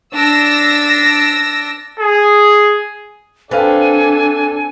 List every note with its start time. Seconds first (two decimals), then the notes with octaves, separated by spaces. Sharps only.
0.11 D4 E6 A#6
2.00 G#4
3.51 C4 D4 A4 B4 F5 G5 G#5